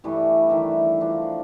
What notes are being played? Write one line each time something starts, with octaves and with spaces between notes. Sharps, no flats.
G2 E3 G3 A3
D#3 E3 E5 D6
F3 D4